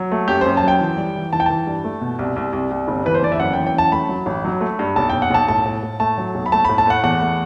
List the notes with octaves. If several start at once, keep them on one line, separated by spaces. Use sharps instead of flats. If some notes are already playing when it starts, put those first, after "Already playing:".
Already playing: F#3
A3
F#2 G4
F#2 C5
A5
F#3 G5
E3
G3
E3
E3 A5
G5
E3 A5
G2
A3
B2
C2
C2
C2
C2
G1
E3 B4
C5
G1 D5
E5
F#2 F#5
E3 G5
G5
F#2 A5
A3 B5
F#3
A1
F#3
A3
G2
B1 A5
B1 G5
F#5
B1 A5
A2 A5
A2
A2
A3 A5
F#3
B1
B5
A3 A5
A2 B5
A5
A3 F#5
E2 F#5
A3